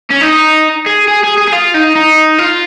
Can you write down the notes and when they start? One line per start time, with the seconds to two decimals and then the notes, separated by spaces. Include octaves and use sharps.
0.10 C#4
0.21 D#4
0.86 G#4
1.08 G#4
1.23 G#4
1.37 G#4
1.47 G#4
1.52 F4
1.74 D#4
1.95 D#4
2.39 F4